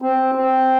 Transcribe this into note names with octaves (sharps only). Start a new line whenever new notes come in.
C4
C4